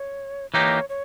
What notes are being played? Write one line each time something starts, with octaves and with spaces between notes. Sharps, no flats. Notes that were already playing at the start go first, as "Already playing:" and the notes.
Already playing: C#5
E3 A#3 D#4 G4 C#5
C#5